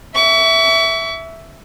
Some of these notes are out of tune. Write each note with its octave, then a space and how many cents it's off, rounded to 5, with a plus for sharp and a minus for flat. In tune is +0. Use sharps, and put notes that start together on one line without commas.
E5 +0 C#6 +40